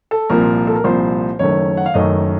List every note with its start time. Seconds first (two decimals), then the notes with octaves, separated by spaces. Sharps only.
0.11 A4
0.29 C2 A#2 F3 A#4
0.67 A4
0.75 A#4
0.84 C2 A#2 F3 C5
1.39 F#1 F#2 D#3 A3 C#4 C#5
1.77 F#5
1.86 F5
1.94 F#1 F#2 D#3 A3 C#4 D#5